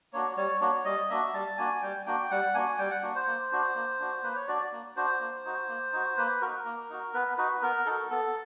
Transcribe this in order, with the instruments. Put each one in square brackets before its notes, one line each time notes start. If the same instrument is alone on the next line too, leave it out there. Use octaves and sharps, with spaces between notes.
[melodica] A#3 D4 F#4 C#5
G3 C#5
A#3 D4 F#4 C#5
G3 D#5
A#3 D4 F#4 E5
G3 A5
A#3 D4 F#4 G#5
G3 G5
A#3 D4 F#4 G5
G3 F#5
A#3 D4 F#4 G#5
G3 G5
F#5
A#3 D4 F#4
C5
A#3
D4 F#4
A#3
D4 F#4
A#3 B4
C#5
D4 F#4 D5
A#3
D4 F#4 C5
A#3
D#4 F#4
A#3
D#4 F#4
A#3 B4
D#4 F#4 A#4
A#3
D#4 F#4
B3 B4
D#4 F#4 B4
B3 A#4
D#4 F#4 A4
B3 A4